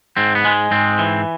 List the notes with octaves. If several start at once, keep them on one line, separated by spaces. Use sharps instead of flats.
G#2 C4
B3
G#3
G#2 C4
E3